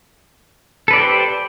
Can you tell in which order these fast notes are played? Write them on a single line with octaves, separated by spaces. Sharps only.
A4 B4 D5 G4 C5